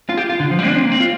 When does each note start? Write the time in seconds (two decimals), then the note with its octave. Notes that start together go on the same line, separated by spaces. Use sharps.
0.09 F4
0.17 G4
0.29 F4
0.40 D3
0.51 F3
0.59 G3
0.67 D4
0.76 C4
0.84 A#3
0.92 C4
1.00 F4